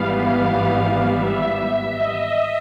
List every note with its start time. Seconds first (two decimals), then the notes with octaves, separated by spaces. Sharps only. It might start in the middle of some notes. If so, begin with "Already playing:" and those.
Already playing: G#1 G#2 E3 G3 B3 F5
1.07 E5
1.91 D#5